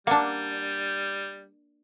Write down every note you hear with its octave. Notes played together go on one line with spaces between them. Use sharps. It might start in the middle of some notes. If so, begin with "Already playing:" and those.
G3 A#3 D4 F#5 A5